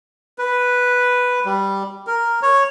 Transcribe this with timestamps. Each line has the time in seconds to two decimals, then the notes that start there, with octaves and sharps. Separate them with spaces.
0.38 B4
1.45 G3
2.07 A#4
2.42 C#5